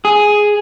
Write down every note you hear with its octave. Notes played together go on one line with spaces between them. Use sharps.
G#4